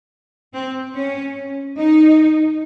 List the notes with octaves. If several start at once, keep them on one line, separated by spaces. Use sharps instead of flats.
C4
C#4
D#4